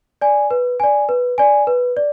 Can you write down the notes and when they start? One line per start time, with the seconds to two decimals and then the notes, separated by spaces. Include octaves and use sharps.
0.21 D5 G#5
0.51 B4
0.80 D5 G#5
1.09 B4
1.38 D5 G#5
1.67 B4
1.97 D5